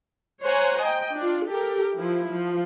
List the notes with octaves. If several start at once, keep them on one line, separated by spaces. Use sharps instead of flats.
C5 C#5 F#5 G#5 A#5
D#5 G5
D4 F4
G4 A4 A#4
F3 E4
F3